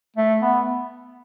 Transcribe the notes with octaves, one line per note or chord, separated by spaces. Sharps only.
A3
B3